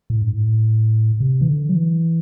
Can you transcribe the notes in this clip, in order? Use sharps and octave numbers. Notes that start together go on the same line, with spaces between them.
A2
G2
A2
C3
E3
D3
F#3
E3